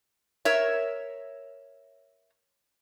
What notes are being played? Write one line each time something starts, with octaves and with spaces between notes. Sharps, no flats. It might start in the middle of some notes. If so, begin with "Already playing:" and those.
A#4 C#5 E5